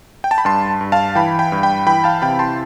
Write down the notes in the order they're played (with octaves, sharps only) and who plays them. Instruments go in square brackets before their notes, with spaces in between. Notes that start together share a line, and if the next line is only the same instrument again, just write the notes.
[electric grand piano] G5
A5
B5
G2 A5 C6
G2
F5 A5
E3 G5 B5
G5 B5
G2
G5 B5
E3 G5 B5
F5 A5
C3 G5 B5
A5 C6